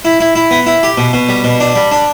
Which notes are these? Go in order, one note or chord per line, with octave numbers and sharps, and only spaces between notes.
E4
E4
E4
B3
E4
G4
B2
B2
G3
B2
D4
G3
D4